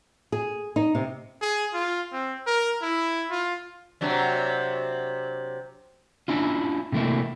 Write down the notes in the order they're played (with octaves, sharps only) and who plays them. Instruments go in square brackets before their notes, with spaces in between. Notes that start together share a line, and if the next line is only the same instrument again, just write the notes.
[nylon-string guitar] G#4
D#4
C3
[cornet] G#4
F4
C4
A#4
E4
F4
[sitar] C3 F#3 D4
[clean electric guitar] C#4 D4 E4 F4
C3 E3 A3 A#3 E4